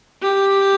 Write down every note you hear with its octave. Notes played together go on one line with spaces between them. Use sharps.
G4